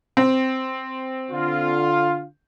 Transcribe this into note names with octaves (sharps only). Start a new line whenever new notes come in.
C4
D3 F4